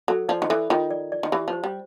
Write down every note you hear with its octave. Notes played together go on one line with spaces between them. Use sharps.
F#3 A4
F3 D5
D#3
E3 A4
D#3 F4
D5
D5
D#3
E3 G4
F3
C5
G3